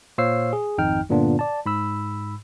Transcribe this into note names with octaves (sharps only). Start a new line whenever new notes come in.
A#2 C5 C#5 F5 E6 C7
G#4
G#1 F2 D#4 G5 F6
G2 A#2 D3 B3 D4 F4
D5 A5
G#2 B5 E6